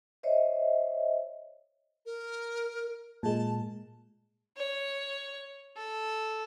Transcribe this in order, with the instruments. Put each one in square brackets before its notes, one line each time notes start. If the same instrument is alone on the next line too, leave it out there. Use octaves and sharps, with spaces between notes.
[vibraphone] C5 C#5 D#5 E5
[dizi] A#4
[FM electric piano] A#2 G#3 [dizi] A5
[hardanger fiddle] C#5
A4